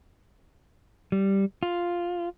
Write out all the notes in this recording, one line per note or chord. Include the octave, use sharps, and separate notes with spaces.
G3
F4